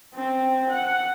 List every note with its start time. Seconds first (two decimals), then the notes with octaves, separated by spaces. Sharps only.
0.14 C4
0.69 F#5